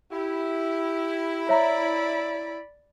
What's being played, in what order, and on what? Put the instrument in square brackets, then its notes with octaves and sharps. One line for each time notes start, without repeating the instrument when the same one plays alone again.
[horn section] E4 [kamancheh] G4
[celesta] C#5 E5 A#5 [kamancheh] D5 B5